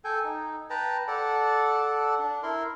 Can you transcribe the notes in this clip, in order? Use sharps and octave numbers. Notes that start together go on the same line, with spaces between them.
A4 G5 G#5
D#4
B4 G5 A5 A#5
A4 D5 F#5 A5
D4
E4 A#4 C6